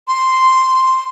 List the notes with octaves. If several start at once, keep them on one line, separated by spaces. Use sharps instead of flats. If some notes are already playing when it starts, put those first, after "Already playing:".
C6